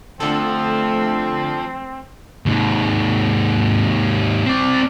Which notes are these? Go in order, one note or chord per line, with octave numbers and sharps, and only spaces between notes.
D3 F3 A3 C4 A4
D#2 G#2
C4 D5